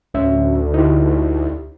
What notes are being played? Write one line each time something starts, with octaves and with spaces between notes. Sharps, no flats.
D2 A2 C#4 E5
D#4 E4 G4